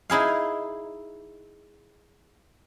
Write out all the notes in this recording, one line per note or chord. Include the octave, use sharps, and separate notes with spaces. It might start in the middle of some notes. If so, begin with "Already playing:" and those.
D#4 E4 G#4 F5